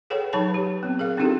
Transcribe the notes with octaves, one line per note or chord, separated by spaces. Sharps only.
G#4 A4 B4 C#5 F#5 G5
F#3 D#4 B4 C#5 A5 B5
G4
B3 C4
G#4 A#4 F5
C4 D4 D#4 F4 G4 A4